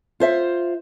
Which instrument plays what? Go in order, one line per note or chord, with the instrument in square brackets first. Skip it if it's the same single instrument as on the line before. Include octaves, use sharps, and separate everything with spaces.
[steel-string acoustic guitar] F4 C5 E5